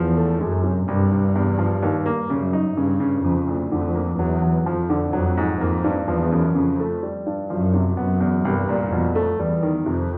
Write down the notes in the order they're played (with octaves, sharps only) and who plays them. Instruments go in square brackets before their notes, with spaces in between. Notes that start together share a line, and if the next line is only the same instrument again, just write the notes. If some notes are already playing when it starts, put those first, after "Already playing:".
Already playing: [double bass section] E2 [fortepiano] F3
[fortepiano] A3
[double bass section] F#2 [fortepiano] G#3
[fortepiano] C3
[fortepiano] C2 [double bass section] G2
[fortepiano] C2
E2
F3
D#2
A#3
[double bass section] F#2 [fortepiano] C#3
[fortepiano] D#4
[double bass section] G2 [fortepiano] C#3
[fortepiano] C#3
[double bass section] F2 [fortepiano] C#3
[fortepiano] D2
[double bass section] F2 [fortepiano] D3
[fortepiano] A#3
[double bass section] E2 [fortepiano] F#3
[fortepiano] F#3
[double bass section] F2 [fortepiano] F3
[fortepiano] D3
[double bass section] F2 [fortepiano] F#3
[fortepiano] G#2
[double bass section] F2 [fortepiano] A#3
[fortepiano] G2
[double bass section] E2 [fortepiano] F3
[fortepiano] F#2
[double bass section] F2 [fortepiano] C#3
[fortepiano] A3
G3
G2
[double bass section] F#2 [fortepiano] F3
[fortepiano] C3
[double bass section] F#2 [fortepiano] B3
[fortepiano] E2
[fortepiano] C2 [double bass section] G2
[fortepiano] A#2
[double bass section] F2 [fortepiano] B2
[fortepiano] A3
[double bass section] E2 [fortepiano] G3
[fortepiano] D#3
[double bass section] F2 [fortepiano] C3